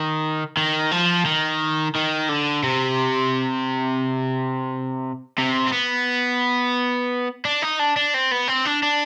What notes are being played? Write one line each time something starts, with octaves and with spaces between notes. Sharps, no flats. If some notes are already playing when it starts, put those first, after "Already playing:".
Already playing: D#3
D#3
F3
D#3
D#3
D3
C3
C3
C4
B3
D4
D#4
D4
D4
C4
B3
C4
D4
D4